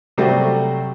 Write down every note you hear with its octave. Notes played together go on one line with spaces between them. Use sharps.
C3 F#3 G3 A3 F#4 C5